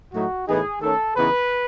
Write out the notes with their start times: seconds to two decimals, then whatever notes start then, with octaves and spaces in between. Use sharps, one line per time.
0.14 A2 F#3 A3 D#4 F#4
0.48 A2 E3 B3 D#4 G#4
0.82 D#3 A3 C#4 A4
1.16 C#3 E3 B3 D#4 B4